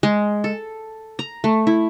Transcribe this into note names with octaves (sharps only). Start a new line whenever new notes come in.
G#3
A4
A#5
A3
E4